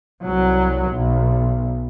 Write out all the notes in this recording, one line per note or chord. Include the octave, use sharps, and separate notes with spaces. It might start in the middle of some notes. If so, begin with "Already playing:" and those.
C2 F#3
B1